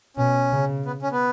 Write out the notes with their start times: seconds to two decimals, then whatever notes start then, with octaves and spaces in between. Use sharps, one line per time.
0.17 B2 C#4
0.52 C#3
0.86 B3
1.02 C#4
1.12 B3